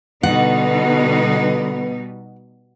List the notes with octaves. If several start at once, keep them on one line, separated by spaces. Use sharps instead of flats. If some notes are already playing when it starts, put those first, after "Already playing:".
B2 D3 G3 B3 D#4 F#5